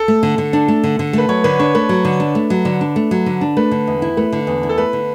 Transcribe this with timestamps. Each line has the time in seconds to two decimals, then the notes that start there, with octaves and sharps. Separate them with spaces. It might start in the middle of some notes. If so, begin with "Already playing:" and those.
Already playing: A4
0.08 A3
0.23 D3
0.38 D3
0.53 D4
0.68 A3
0.84 D3
0.99 D3
1.13 A3 B4
1.29 F#3 C#5
1.44 D3 B4
1.59 D4 C#5
1.75 A3 B4
1.89 F#3
2.05 D3
2.20 D4
2.35 A3
2.50 F#3
2.65 D3
2.81 D4
2.96 A3
3.11 F#3
3.26 D3
3.41 D4
3.57 A3 B4
3.71 D3
3.87 E2
4.02 E4
4.17 A3 B4
4.32 D3
4.47 E2
4.63 E4
4.69 A4
4.78 A3 B4
4.93 D3